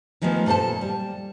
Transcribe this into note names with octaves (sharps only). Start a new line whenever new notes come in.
D#3 F3 G#3 A3 B3
A#2 A4 A#4 C5 A5
G3